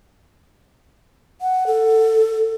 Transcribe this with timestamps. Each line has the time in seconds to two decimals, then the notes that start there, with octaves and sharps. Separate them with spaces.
1.41 F#5
1.67 A4